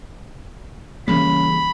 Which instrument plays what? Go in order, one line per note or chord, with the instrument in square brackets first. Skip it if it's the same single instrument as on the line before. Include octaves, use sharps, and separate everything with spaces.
[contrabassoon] C#3 [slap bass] E3 G3 A#3 [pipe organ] B5